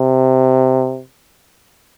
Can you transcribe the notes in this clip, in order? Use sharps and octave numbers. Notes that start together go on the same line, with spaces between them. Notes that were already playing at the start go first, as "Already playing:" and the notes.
Already playing: C3